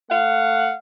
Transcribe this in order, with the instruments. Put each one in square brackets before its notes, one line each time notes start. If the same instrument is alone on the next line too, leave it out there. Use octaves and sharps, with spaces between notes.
[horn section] A3 F5 F#5